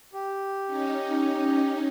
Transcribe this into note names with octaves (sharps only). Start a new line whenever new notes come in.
G4
C#4 D#4